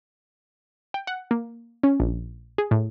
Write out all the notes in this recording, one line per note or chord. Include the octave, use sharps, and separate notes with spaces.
G5
F#5
A#3
C#4
A#1
G#4
A2